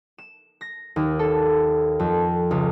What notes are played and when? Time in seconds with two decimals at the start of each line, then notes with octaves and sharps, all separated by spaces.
0.18 E7
0.61 A#6
0.96 D#2
1.19 A4
1.99 F2
2.51 C#2